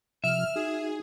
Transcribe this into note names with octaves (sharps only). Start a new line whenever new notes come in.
C3 F3 E5 F6
D#4 F#4 G#4